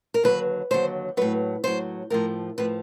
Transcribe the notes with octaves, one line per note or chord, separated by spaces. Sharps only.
A#4
D#2 D3 F#3 B4
D#2 D3 F#3 C5
A2 F#3 B4
A2 F#3 C5
A2 F3 A#4
A2 F3 B4